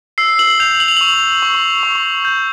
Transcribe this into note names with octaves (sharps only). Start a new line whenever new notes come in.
E6 C7
F#7
G6 F7
F#7
F7
C#6 F#7
C#6
C#6
G6